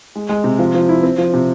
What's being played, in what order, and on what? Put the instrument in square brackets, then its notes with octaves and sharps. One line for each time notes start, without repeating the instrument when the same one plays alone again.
[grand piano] G#3
G#3
C3
F3
F3
E4
C4
F3
C3